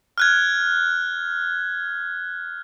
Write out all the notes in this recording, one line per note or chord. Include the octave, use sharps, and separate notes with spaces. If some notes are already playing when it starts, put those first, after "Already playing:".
F6 F#6 G#6